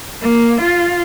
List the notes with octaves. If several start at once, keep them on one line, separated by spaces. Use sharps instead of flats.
A#3
F4